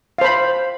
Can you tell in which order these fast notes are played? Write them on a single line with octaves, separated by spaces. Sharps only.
F5 C5 B5